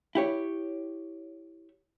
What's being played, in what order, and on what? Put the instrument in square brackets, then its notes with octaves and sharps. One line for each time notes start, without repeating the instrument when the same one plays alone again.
[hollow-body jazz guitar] E4 G4 C#5